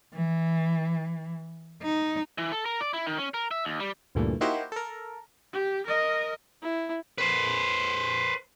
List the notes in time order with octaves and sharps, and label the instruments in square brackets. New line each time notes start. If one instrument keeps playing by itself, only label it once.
[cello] E3
D#4
[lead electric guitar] E3
A4
A#4
D5
E4
D#3
C#4
A#4
E5
D#2
G3
[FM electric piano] D2 G2 A#2 E3 A3
A#3 D#4 E4 F#4 G4 C5
A4 A#4
[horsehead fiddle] G4
A#4 D#5
[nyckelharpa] E4
[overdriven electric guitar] B4 C5